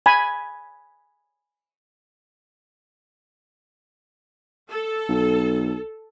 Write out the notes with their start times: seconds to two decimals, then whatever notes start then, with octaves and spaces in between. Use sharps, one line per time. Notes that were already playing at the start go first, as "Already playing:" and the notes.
0.06 G#5 B5
4.70 A4
5.09 B1